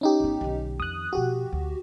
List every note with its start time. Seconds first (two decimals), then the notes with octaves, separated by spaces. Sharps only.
0.01 C#4 D#4 G4
0.20 G1 B3
0.41 B1 D3
0.80 F2 D#3 D#6 F#6
1.13 B2 F3 F#4 G4
1.52 D2